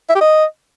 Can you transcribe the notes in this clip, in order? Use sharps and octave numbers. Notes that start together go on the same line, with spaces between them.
E5
G4
D#5